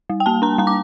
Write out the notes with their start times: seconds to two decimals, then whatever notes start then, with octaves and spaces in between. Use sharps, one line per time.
0.10 G3
0.20 G5
0.26 A#3 A5
0.42 D4 A#5
0.58 G3 A#5
0.67 D6